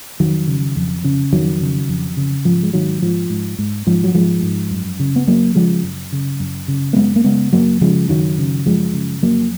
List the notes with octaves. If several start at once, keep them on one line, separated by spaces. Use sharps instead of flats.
F2 D#3 F#3
C#3
F2
C#3
F2 D#3 F#3
C#3
F2
C#3
G#2 F3
G#3
G#2 D#3 F#3
G#2 F3
G#2
G#2
G#2 F3
F#3
G#2 F3 G#3
G#2
F#2
C#3
B3
F#2 F#3 A#3
C#3 F3 G#3
F#2
C#3
F#2
C#3
A#3
F#2 G#3 B3
A#3
C#3 G#3 B3
F#2 F#3 A#3
C#3 F3 G#3
F#2 D#3 F#3
C#3
F#2 F3 G#3
C#3
F2 F#3 A#3